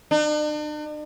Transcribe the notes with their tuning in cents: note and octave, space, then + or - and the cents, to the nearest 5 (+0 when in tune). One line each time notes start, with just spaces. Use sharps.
D4 +45